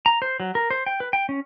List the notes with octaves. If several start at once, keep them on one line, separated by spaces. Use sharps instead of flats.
A#5
C5
F#3
A#4
C5
G5
B4
G5
C#4